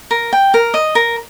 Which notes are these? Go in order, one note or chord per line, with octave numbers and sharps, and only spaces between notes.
A#4
G5
A#4
D#5
A#4